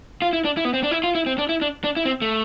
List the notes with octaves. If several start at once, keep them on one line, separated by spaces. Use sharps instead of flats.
F4
E4
D4
E4
B3
C4
D4
E4
F4
E4
C4
D4
E4
D4
D4
E4
C4
A3